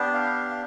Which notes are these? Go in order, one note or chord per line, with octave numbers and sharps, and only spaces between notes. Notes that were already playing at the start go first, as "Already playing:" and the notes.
Already playing: B3 D4 G4
F5